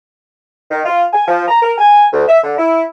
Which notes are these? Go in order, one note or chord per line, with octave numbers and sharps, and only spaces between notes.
D#3
F4
G#5
F3
A#5
A#4
G#5
D2
E5
D3
E4